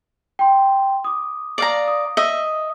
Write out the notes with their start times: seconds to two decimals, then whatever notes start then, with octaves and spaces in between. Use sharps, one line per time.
0.39 G5 C6
1.04 D6 D#6
1.58 D5 F5 A#5
1.88 D#6
2.17 D#5 E5